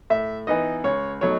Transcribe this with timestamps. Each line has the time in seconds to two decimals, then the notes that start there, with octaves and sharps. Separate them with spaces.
0.10 A2 E5
0.47 E3 B3 D#4 D#5
0.84 C#2 C#5
1.21 B2 F#3 A3 D#4 C#5